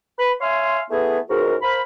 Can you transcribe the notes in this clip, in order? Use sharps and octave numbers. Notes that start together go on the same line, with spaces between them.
B4 B5
C#5 E5 F5 G#5 C6
E3 A3 B3 E4 G#4 B4
C#2 G#2 F#4 A#4
A#4 C5 F5 B5